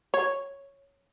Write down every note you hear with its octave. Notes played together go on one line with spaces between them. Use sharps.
C#5